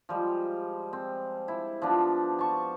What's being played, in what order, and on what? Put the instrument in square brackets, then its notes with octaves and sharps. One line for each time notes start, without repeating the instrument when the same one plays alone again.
[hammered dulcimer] F3 G3 G#3
C4
E4
F3 B3 D4
A5 C#6